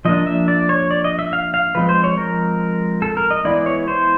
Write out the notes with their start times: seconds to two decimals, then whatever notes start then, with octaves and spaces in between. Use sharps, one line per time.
0.05 F3 A#3 D4 D#5
0.27 E5
0.48 D5
0.69 C#5
0.91 D5
1.04 D#5
1.19 E5
1.33 F5
1.54 F5
1.75 F3 G#3 C4 B4
1.89 C5
2.04 C#5
2.17 A#4
3.02 A4
3.17 A#4
3.31 D#5
3.45 E3 G#3 B3 E4 D5
3.66 C#5
3.88 C5